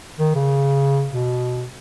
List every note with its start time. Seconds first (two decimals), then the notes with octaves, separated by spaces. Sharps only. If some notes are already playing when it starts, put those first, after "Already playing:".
0.19 D#3
0.35 C#3
1.11 B2